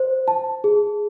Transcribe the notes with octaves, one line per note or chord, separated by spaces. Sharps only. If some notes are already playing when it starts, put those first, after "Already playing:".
Already playing: C5
A5
G#4